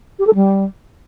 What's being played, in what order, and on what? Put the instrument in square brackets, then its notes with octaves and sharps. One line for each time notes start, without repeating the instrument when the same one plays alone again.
[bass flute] G4
A4
G3